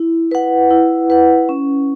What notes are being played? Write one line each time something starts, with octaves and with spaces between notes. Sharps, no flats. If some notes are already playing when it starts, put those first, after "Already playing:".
Already playing: E4
B4 F#5
E4
B4 F#5
C#4